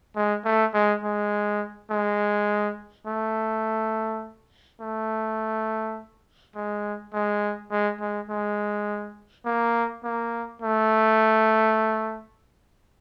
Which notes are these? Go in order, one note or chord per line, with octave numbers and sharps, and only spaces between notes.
G#3
A3
G#3
G#3
G#3
A3
A3
G#3
G#3
G#3
G#3
G#3
A#3
A#3
A3